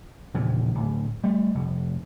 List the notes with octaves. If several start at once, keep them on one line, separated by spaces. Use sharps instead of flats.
A#1 E2 C#3 F3
D1
G3 A3
F1